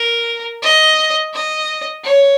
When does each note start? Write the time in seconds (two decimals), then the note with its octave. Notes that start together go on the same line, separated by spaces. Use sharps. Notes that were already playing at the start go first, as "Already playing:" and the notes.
Already playing: A#4
0.63 D#5
1.34 D#5
2.05 C#5